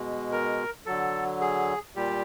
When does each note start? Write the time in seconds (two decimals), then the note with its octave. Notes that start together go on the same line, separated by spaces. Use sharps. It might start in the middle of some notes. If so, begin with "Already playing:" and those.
Already playing: B2 G#3
0.32 A#4
0.86 D3 F#3 A4
1.41 G#4
1.95 A#2 G3 G4